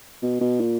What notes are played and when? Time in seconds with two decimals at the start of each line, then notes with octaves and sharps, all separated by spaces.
0.23 B2
0.41 B2
0.60 A#2